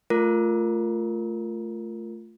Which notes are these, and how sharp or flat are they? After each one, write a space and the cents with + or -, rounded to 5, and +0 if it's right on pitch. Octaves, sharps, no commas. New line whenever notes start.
A3 +0 F4 +0 A#4 +0